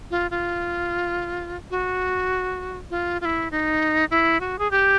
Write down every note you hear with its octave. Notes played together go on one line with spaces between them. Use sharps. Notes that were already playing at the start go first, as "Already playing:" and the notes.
F4
F4
F#4
F4
F4
E4
D#4
E4
F#4
G#4
G4